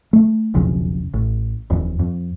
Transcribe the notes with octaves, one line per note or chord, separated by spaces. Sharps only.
A3
E1 B1 F2 C#3
A1
D#1 F2 E3
F2